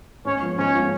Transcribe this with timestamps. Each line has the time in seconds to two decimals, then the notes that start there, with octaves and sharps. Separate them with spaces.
0.25 G#2 C#4 C#5
0.42 F3 B3
0.58 G#2 C#4 C#5
0.75 F3 B3